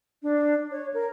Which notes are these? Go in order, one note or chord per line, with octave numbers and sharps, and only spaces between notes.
D4
C#5
A#4